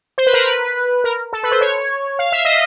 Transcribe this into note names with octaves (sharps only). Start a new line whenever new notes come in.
C5
B4
A#4
B4
A#4
A4
B4
C5
C#5
F5
E5
D#5